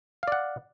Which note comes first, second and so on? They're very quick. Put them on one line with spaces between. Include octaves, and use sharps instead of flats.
F5 D5 F#5